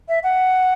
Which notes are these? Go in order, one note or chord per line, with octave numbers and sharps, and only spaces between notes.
E5
F#5